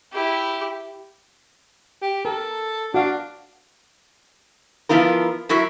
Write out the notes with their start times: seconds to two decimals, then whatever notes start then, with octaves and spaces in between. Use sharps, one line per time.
0.13 E4 G4
2.02 G4
2.25 A4 A#4
2.94 D4 F#4 F5
4.89 F3 B3 E4 F4 A#4
5.49 F#3 E4 F#4 A#4 E5